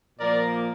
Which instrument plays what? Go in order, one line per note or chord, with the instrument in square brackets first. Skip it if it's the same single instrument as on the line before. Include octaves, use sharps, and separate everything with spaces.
[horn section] A#2 F3 A#3 A#4 D5